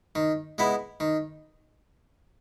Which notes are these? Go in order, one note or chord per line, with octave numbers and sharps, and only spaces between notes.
D#3
G#3 B3 E4
D#3